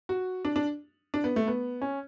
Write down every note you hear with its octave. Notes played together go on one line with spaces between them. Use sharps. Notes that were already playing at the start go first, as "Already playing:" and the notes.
F#4
D4
D4
D4
B3
A3
B3
C#4